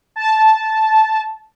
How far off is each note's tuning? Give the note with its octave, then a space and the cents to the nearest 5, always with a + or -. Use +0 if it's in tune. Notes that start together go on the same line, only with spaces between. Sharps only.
A5 -10